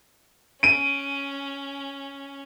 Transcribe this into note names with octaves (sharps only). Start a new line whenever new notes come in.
C#4 D7 D#7